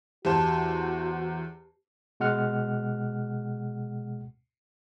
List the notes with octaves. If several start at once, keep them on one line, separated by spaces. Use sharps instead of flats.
E2 F#4 G4 C5 A5
B2 G#3 F#5 F6